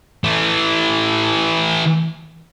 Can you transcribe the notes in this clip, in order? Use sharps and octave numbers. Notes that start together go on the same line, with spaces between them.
E3 A3